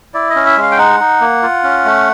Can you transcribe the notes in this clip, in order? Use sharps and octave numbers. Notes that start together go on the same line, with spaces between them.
E4 D5
D#5
C#4
E5
G#3
F5
G5
D#4 F#5
D#4
A#3
F4
C#4
A3